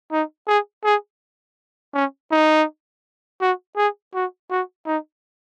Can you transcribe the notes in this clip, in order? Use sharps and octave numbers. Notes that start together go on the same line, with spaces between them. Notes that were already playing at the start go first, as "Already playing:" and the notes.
D#4
G#4
G#4
C#4
D#4
F#4
G#4
F#4
F#4
D#4